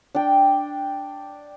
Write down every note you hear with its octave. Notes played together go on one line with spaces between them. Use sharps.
D4 G5